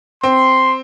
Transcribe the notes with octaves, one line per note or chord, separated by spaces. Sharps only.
C4 C6